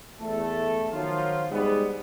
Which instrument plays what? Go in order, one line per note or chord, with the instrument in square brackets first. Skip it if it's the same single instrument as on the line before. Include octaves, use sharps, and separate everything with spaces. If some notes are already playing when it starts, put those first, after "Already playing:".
[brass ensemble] E2 A3 A4
D#3 F3 F#3 F4
G#2 G3 G#3 B3